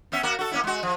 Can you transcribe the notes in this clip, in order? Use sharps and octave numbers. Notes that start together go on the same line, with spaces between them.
B3 C#4 E5
A#3 F#4 A#4
F#4 A4
A#3 C#4 E4
G#3 F#4
F3